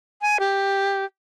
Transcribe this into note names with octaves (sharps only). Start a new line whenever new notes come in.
G#5
G4